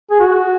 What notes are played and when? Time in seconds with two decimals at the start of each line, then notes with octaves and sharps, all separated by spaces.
0.11 G#4
0.20 F#4